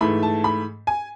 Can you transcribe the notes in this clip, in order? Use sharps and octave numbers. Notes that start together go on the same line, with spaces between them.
G#2 E3 A3 B5
A5
B5
G#5